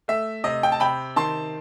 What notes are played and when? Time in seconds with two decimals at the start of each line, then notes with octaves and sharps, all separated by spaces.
0.08 A3 E5
0.44 C3 D#5
0.63 G5
0.72 A5
0.80 C3 G5 B5
1.16 D#3 A5 C6